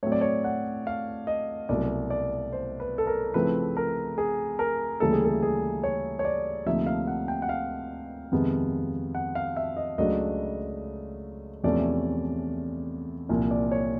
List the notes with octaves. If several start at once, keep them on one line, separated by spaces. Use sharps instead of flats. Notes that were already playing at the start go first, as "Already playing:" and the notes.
A2 F#3 A3 C4 C#5
D5
C#5
F#5
F5
D#5
C2 B2 F#3 A3 D5
D5
C5
B4
A4
A#4
C#3 F3 A3 C4 E4 B4
A#4
G#4
A#4
D2 C#3 E3 G3 A#3 A4
G#4
A4
G#4
C#5
C#5
D5
D2 C3 F3 A#3 D#4 E5
F5
F#5
G5
F#5
F5
F2 C3 D#3 G#3 B3
F#5
F5
E5
D#5
C#2 C#3 F#3 A3 D4 D#5
E2 C3 F3 A3 C#4 D5
C2 A#2 F3
D5
C#5